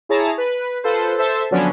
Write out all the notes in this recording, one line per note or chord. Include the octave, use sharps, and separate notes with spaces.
E4 G#4 C#5 A5 A#5
B4
F4 A4 B4 C5
A4 C5 E5 A5
D3 F3 F#3 B3 C#4 D4